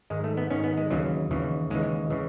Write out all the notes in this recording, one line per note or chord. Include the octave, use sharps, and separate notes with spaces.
G#2 D#3 G#3
A3
B3
G#2 D#3 C#4
B3
G#3
D#2 C#3 E3 F#3
D#2 C#3 E3
D#2 C#3 E3 G#3
C#3 E3